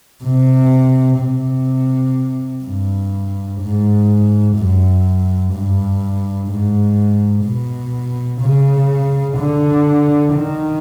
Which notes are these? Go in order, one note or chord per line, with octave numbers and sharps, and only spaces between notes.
C3
C3
G2
G#2
F#2
G2
G#2
B2
C#3
D3
D#3